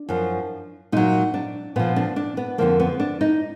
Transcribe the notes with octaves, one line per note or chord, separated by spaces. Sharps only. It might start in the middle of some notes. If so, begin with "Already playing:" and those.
Already playing: D4
F#2 F3
A#2 F#3 D#4
D4
A#2 F3 B3
D4
D4
B3
F2 D3 F3 A#3
B3
D4
D#4